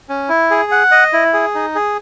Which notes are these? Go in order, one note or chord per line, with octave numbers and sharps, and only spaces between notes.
C#4
E4
G#4
F#5
D#5
E4
G#4
D#4
G#4